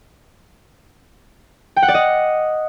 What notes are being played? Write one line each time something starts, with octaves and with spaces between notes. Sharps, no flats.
G5
F#5
D5
D#5